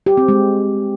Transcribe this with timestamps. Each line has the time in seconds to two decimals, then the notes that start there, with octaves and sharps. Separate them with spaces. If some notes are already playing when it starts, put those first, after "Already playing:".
0.06 G4
0.17 C4
0.28 G#3